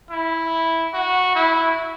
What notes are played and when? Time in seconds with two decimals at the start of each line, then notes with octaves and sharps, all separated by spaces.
0.11 E4
0.93 F#4
1.35 E4